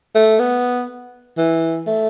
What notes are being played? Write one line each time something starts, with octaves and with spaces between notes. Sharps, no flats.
A3
B3
E3
A3